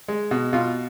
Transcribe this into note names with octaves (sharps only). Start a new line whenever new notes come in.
G#3
B2
B2 F4